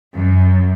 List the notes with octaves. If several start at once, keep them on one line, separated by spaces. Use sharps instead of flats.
F#2